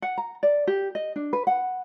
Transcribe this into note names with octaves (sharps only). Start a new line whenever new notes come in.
F#5
A#5
D5
G4
D#5
D4
B4
F#5